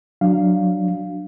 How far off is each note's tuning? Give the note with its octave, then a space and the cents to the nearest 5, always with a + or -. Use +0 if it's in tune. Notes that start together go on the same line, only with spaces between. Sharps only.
F#3 +0 D4 +10 F5 +0